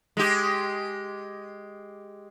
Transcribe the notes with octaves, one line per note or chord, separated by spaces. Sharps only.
G#3 G4